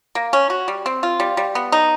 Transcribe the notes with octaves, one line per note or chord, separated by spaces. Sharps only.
A#3
C#4
F#4
G3
C4
F4
G3
G3
B3
D#4